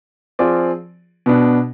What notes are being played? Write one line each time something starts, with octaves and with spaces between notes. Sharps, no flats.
F3 C4 F4 G#4 D5
B2 B3 D4